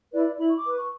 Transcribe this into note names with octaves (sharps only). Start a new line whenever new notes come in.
E4 B4 D5
E4 B5
C#6
D6
B4
C#6